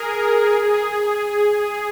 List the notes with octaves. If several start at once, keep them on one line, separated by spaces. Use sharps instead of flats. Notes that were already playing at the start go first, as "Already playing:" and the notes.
Already playing: G#4 A#4
A#4
G#4
G#4